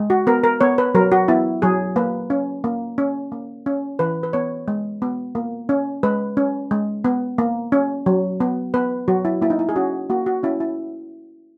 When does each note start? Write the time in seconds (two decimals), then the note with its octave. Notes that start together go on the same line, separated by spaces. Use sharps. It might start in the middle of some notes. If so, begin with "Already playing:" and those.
Already playing: G#3
0.10 F#4
0.27 B3 A#4
0.44 A#4
0.61 B3 C#5
0.78 B4
0.95 F#3 A#4
1.12 F#4
1.28 B3 E4
1.62 F#3 G#4
1.96 A#3 B4
2.30 C#4
2.64 A#3
2.98 C#4
3.32 A#3
3.66 C#4
3.99 E3 B4
4.23 B4
4.33 B3 C#5
4.68 G#3
5.02 B3
5.35 A#3
5.69 C#4
6.03 G#3 B4
6.37 C#4
6.71 G#3
7.05 B3
7.38 A#3
7.72 C#4
8.06 F#3
8.40 B3
8.74 B3 B4
9.08 F#3 F#4
9.25 E4
9.41 A#3 E4
9.50 D#4
9.59 E4
9.69 G#4
9.76 C#4 F#4
10.10 A#3 F#4
10.26 F#4
10.43 C#4 E4
10.60 E4